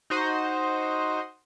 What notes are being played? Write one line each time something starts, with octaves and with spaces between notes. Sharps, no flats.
D#4 F#4 C5 D#5